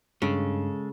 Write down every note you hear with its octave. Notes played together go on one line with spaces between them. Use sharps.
G2 C#3 G#3 A4